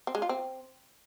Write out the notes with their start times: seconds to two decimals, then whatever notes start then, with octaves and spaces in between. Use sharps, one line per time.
0.07 C4
0.15 G#3
0.22 F4
0.29 C4